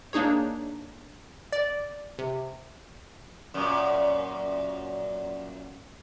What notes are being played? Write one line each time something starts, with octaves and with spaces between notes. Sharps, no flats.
A#3 D4 D#4 G#4 C#5
D5
C3
F#2 A#2